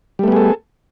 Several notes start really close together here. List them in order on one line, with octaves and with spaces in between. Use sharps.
G3 A3 B3 G#4 A4